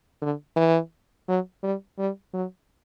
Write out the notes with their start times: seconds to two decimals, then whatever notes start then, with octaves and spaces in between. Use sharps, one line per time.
0.22 D3
0.56 E3
1.28 F#3
1.63 G3
1.98 G3
2.34 F#3